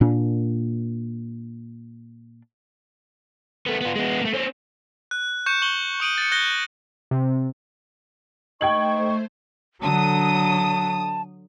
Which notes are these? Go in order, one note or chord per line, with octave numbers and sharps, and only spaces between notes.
A#2 D4
A3 B3
B3 F4
G#3 B3
A3 A#3
C4 C#4
F#6
C#6 G6 C#7 E7
C#6 F#7 G7
C#6 D#6 D7 D#7 F#7
A6 C#7
F#6 G6 A#6 G7
C3
A3 D#4 C5 G5 C#6 G#6 F#7
D3 F#3 A5 D#6